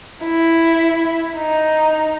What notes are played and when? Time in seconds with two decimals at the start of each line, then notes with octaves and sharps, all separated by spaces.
0.23 E4
1.36 D#4